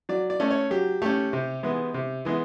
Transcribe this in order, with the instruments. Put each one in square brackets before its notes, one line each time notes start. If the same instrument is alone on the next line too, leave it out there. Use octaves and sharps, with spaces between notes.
[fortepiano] F#3 D5
D5
A3 C#4
C#5
F#3 G4
A3 C#4 G4
C3
E3 G#3 B3 E4
C3
E3 G#3 B3 E4